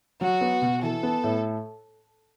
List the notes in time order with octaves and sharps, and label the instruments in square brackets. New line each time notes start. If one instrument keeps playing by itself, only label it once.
[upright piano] F#3 [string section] F#4
[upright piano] B3
B2
[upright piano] E3 [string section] A4
[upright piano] B3
A2